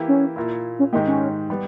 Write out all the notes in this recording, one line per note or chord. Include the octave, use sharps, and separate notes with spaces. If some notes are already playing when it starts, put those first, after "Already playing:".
Already playing: E3 A#3 E4 G4
C#4
A#2 A#3 E4
C#4
G#2 D#3 G#3 A#3 D#4 G4
C#4
G3 B3